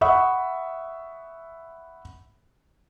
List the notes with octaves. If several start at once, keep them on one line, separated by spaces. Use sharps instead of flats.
E5 F#5 B5 C#6 D#6